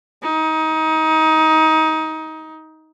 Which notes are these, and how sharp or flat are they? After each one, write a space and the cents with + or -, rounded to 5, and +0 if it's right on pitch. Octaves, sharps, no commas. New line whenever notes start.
D#4 +25